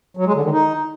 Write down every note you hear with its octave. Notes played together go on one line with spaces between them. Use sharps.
F#3
G#3
D3
D#3
D#4